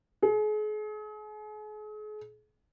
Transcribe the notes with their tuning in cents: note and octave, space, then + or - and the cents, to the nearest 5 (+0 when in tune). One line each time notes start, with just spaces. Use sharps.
G#4 +40